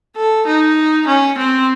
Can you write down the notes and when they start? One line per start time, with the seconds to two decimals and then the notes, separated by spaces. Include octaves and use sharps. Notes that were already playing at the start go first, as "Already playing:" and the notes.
0.17 A4
0.47 D#4
1.08 C#4
1.38 C4